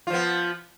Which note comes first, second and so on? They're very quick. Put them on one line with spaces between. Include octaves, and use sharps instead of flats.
F4 F3 B3